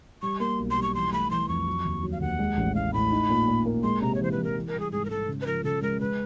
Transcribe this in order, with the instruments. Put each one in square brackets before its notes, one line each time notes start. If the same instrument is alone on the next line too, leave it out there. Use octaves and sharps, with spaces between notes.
[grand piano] G3 [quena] C#6
[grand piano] A#3 [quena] C6
[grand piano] B1
[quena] C6
[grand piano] G3
[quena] C#6
[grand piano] E3 [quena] C6
[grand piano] A3 [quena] B5
[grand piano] E3 [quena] C6
[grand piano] F2 [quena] C#6
[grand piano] F#3
D#2
F#3
[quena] F5
[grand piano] D#2 [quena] F#5
[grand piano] G#3
A1
[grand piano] A2 [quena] F5
[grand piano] A2 [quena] B5
[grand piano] D#4
A#2
A#2
A#3
[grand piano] G#3 [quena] C6
[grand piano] C3 [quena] A#5
[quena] C#5
[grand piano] E3 [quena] C5
[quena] B4
[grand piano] E3
[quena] A#4
[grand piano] E3
[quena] A#4
[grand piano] G3
[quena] G#4
[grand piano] G#2 [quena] G#4
[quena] A#4
[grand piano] G#2 [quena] A4
[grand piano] C#3
[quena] B4
[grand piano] F3 [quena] A#4
[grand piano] C#3 [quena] A4
[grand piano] G#3 [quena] A#4
[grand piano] G#3 [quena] B4